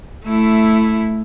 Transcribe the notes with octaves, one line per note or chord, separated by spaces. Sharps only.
A3 E4